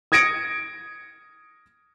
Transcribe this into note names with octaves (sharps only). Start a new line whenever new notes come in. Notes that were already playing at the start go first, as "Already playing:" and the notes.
D#6 G#6 A#6 C#7 D7